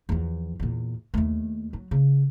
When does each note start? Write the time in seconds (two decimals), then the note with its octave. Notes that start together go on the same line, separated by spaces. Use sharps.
0.09 E2 F3
0.60 E2 A#2
1.14 D#2 A3
1.73 F#3
1.91 C#3